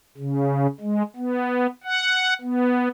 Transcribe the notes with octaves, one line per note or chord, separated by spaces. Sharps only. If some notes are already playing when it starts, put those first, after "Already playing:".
C#3
G#3
B3
F#5
B3